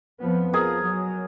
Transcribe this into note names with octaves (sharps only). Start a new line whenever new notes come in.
F2 F3 B3
F3 G#4 A#4 D#5
F#3